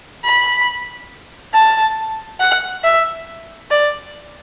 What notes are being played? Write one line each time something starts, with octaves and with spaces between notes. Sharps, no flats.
B5
A5
F#5
E5
D5